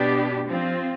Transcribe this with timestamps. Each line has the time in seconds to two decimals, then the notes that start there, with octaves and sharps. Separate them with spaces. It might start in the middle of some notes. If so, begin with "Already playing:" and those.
Already playing: B2 B3 D4 G4
0.47 F3 C4 F4